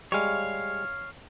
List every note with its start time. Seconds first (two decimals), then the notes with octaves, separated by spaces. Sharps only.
0.12 G3 G#3 C#5 F5